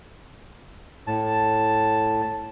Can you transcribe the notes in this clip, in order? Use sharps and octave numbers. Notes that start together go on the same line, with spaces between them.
A2 A5